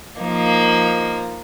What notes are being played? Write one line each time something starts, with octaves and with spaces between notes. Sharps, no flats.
F3 A#3 D#4